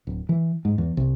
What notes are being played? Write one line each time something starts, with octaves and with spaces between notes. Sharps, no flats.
D1
E3
G#2
E2
C2